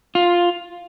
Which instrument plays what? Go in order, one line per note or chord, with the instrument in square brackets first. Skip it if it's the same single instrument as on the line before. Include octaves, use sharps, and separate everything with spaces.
[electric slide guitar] F4